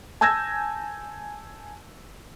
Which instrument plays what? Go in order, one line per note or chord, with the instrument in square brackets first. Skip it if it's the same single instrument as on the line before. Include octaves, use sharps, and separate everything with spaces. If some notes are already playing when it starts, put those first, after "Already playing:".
[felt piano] G#5 A5 E6 G6 G#6 A#6